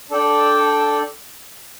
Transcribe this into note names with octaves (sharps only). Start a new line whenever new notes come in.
D4 A4 D5 G5